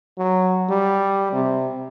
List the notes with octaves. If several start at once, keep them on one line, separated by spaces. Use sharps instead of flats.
F#3
G3
C3